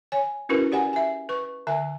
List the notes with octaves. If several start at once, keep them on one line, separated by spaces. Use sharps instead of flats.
C#5 G#5
C#4 E4 F#4 A#4 B4
G4 D5 F#5 G#5
E5 G#5
B4 C#6
D3 E5 G#5